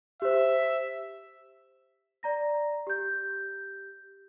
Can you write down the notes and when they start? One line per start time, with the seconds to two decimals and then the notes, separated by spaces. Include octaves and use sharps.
0.22 G4 C5 E5
2.23 D5 A#5 A#6
2.87 G4 G6